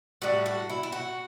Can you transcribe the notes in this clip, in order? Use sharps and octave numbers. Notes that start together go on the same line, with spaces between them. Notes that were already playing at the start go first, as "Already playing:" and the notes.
A2 G3 D4 F#4
F#4
E4
E4
F#4